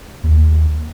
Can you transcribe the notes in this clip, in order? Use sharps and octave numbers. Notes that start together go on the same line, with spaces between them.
D#2